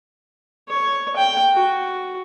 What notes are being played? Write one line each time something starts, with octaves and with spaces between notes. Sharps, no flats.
C#5
G5
F#4